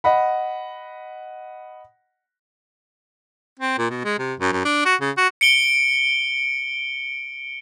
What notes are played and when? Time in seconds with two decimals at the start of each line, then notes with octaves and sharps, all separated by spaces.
0.04 D#5 F#5 B5
3.59 C4
3.78 A#2
3.90 B2
4.05 G#3
4.19 C3
4.39 F#2
4.52 F#2
4.65 D4
4.85 F#4
5.01 C#3
5.17 F#4
5.41 C#7 D7 G7